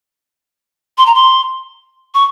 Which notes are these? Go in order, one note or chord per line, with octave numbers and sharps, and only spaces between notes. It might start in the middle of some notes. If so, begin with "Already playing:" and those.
C6
A#5
C6
C#6